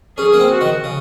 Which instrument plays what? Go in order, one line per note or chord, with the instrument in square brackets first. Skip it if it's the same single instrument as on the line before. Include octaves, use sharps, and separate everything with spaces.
[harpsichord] C#4 [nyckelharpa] G#4
[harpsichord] A#3
C4
[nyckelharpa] F#4
[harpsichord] D#3
C#3